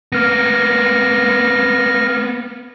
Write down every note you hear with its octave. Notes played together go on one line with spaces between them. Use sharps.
A#3 B3 F6 A#6